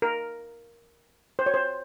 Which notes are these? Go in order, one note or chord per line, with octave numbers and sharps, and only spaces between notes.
A#4
C5
C#5
C5